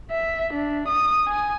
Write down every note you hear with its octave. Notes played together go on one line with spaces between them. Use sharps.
E5
D4
D#6
G#5